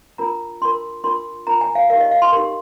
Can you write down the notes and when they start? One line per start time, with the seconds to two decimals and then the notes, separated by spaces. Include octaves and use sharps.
0.18 D4 F4 A#4 A#5
0.61 D4 F4 A#4 C6
1.04 D4 F4 A#4 C6
1.47 D4 F4 A#4 A#5
1.61 G#5
1.75 F5
1.90 D#4 G4 A#4 F5
2.00 D#5
2.11 F5
2.22 C6
2.32 D#4 G4 A#4 C6